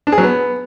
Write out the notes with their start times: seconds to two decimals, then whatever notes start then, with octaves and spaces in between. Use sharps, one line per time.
0.07 D4
0.12 G#4
0.18 F#3
0.23 B3